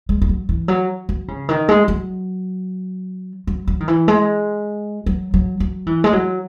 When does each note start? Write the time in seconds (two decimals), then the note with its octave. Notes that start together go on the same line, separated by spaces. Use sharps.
0.09 G#3
0.22 G#3
0.29 F#3
0.49 E3
0.68 F#3
1.09 F#3
1.28 C#3
1.49 D#3
1.69 G#3
1.88 F#3
3.47 F#3
3.67 F#3
3.80 D#3
3.88 E3
4.08 G#3
5.06 F#3
5.34 F#3
5.60 F#3
5.87 E3
6.04 G#3
6.13 F#3